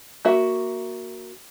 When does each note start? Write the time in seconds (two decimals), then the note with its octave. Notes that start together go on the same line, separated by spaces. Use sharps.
0.25 A#3 F#4 E5